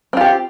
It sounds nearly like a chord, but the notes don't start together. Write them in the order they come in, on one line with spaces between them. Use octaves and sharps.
C4 F4 G4